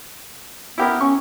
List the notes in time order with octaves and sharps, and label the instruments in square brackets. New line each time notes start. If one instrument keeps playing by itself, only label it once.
[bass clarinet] B3 [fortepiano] E4 G4 A#4
[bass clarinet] C#4 [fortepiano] C#6